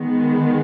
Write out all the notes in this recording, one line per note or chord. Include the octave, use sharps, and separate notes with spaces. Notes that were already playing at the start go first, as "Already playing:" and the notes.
Already playing: D#3 G#3 B3